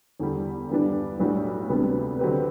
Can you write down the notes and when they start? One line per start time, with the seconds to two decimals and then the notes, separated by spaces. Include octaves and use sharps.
0.20 E2 D3 G3
0.69 G2 E3 G3 B3 D4
1.20 B1 A2 G3 D4 F#4
1.70 D2 C3 G3 B3 D4
2.19 D3 F#3 C4 G4 B4